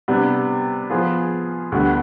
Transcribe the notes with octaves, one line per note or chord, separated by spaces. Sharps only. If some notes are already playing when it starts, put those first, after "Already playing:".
C3 G3 B3 D4
F3 B3 F4 G#4
D2 D3 G3 B3